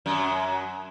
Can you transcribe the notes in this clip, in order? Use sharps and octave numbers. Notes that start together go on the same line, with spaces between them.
F#2 F#3